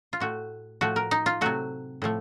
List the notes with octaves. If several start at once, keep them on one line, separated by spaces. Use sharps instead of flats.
F4
A2 A3 F#4
A2 F3 A3 F#4
A#4
D#4
F4
C3 F#3 A3 F#4
A2 F3 A3